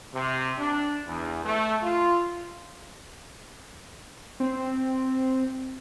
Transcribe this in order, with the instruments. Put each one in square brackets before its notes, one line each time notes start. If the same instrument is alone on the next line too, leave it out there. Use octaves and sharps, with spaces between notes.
[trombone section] C3
D4
E2
A3
F4
[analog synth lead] C4